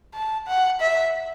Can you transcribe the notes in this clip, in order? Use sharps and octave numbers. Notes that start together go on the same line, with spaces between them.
A5
F#5
E5